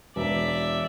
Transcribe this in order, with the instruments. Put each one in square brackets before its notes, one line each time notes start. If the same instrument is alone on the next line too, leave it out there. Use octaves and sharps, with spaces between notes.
[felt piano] E1 [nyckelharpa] D5 E5